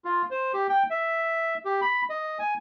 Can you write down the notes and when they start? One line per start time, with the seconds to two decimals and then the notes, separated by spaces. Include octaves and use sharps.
0.05 F4
0.31 C5
0.54 G4
0.69 G5
0.90 E5
1.65 G4
1.82 B5
2.10 D#5
2.39 G#5